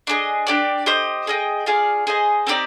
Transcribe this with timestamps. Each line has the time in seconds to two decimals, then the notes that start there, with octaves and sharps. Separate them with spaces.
0.07 D4 G#4 D#5
0.47 D4 G4 D5
0.86 G4 C5 D#5
1.27 G#4 D#5 G5
1.66 F4 G#4 D5 F5
2.07 G#4 C5 D#5
2.47 C4 D#4 G4 D5